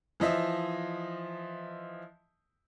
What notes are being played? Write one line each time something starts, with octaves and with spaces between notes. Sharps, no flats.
E3 F3 D#5 E5